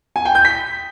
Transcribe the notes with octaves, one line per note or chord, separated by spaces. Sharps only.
G#5
G5
G6
B6